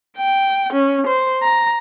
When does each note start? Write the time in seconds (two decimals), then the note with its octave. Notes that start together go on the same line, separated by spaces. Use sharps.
0.18 G5
0.73 C#4
1.07 C5
1.42 A#5